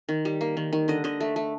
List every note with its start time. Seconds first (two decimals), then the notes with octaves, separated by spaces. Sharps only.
0.09 D#3
0.25 G3
0.41 A#3
0.57 D#3
0.73 D#3
0.88 D3 D#5
1.04 D3 D#5
1.20 A3
1.36 A3